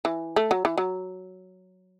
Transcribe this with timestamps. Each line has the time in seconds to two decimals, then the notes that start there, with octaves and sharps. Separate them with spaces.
0.05 E3
0.36 A3
0.51 F#3
0.65 E3
0.78 F#3